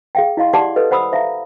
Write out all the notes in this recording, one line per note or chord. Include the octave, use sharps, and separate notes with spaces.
G#4 F5 G5
E4 D#5 F5 C6
G4 D5 F#5 A5 C6 D6
A4 B4 D#5
C5 F#5 B5 D#6 E6
C5 E5 F5 A#5